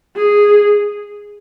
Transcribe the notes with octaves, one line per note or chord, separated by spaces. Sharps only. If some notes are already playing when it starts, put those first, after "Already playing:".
G#4